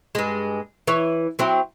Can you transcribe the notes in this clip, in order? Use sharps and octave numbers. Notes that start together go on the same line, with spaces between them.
G2 G#3
E3 E4 C#5
F#3 C4 E4